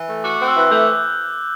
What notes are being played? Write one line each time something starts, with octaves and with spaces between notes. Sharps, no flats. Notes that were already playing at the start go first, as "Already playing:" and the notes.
Already playing: E3
A3
F#4 D6
D6
C4 F#6
E6
E3
F#6
A3 G6